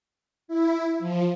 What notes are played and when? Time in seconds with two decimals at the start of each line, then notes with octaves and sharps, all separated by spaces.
0.48 E4
1.00 F3